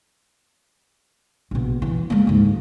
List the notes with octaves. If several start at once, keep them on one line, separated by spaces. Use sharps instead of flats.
A#1 B2
E3
G#3 A#3
D2 G#2